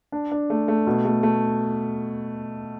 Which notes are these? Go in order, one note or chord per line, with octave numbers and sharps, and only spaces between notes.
D4
D4
A3
A3
B2
A3
A3